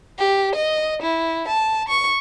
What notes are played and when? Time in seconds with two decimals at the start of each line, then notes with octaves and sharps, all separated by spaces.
0.18 G4
0.55 D#5
1.02 E4
1.48 A5
1.88 C#6